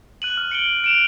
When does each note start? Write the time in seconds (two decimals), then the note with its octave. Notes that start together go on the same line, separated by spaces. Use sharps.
0.22 F#6 D#7 F#7
0.37 F6
0.51 C#7 D7 G7
0.84 D7 E7 F7